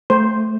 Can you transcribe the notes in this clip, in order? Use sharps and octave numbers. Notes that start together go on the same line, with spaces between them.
A3 C5